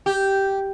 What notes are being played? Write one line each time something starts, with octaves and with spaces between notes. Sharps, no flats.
G4